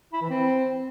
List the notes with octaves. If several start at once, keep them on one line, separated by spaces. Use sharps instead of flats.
E4
E3
C4